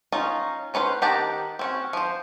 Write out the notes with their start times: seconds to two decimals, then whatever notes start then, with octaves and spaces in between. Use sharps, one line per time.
0.12 C#4 D#4 F4
0.74 F#3 C#4 B4 C5
1.02 D#3 G4 F#5 A5 A#5
1.59 C4 C#4 F#4
1.93 F3 C5